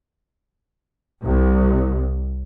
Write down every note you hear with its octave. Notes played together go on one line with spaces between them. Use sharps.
C2